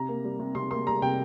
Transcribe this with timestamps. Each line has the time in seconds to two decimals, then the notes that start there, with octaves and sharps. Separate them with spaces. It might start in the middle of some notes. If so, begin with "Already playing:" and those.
Already playing: C3 A#5
0.09 A#3
0.24 G3
0.39 C3
0.55 C3 C6
0.71 A#3 C6
0.87 G3 A#5
1.02 C3 G5